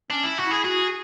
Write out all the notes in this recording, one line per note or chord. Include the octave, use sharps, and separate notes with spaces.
C#4 D4
E4
F#4
E4
G#4
F#4 G#4